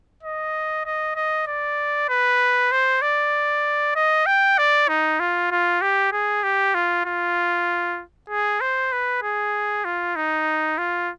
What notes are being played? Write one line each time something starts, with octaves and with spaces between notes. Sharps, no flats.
D#5
D#5
D#5
D5
B4
C5
D5
D#5
G5
D5
D#4
F4
F4
G4
G#4
G4
F4
F4
G#4
C5
B4
G#4
F4
D#4
F4